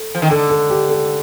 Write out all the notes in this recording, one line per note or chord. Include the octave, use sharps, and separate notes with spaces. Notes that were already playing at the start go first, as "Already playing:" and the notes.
Already playing: A4
F3
D#3
D3 A4
A4
G4
A4